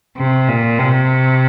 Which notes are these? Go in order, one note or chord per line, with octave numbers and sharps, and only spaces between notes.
C3
A#2
C3